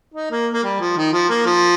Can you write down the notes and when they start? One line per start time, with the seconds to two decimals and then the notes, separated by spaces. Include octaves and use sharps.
0.14 D#4
0.31 A#3
0.53 A#3
0.63 G3
0.80 F3
0.97 D#3
1.13 F3
1.29 A#3
1.46 F3